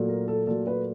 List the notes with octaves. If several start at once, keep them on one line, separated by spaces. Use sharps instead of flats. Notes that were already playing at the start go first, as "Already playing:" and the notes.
Already playing: A#2 F#3 A3
A#4
A4
A#2 F#3 A3 A4
B4